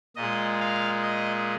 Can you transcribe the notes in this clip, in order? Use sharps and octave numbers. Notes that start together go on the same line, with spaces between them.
A#2 G#3 D#5
F5
D#5